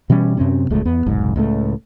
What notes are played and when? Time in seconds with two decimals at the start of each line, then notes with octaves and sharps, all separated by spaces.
0.10 B2 E3 G3 C#4
0.37 F#2 C3 C4 C#4
0.70 D1 C#2 G#3 A3
0.85 E2 B3
1.06 F1 B1 G#2
1.36 C#2 A2 A3